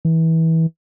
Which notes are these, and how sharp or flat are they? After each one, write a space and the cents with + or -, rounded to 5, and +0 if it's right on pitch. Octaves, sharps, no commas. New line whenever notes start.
E3 -25